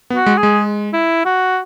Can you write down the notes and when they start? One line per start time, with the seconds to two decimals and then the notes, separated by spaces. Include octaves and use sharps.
0.10 B3
0.15 F#4
0.26 G#3
0.38 G#4
0.43 G#3
0.93 E4
1.25 F#4